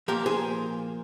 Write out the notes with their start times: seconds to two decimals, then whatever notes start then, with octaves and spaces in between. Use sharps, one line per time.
0.08 A#2 F3 A#3 G4 A#4
0.26 G#4 C5